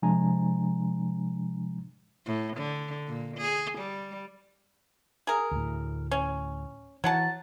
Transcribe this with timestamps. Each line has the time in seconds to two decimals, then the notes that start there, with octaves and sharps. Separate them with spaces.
0.02 C3 F3 G#3 D4 G#5 A#5
2.26 A2
2.57 D3
3.07 A#2
3.37 G#4
3.78 G3
5.27 G#4 A#4
5.51 D2 A2
6.11 C#4
7.04 E3 F#3 F#5 A5